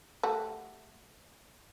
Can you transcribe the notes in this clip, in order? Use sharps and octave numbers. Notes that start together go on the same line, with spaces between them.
G3 A3 F#4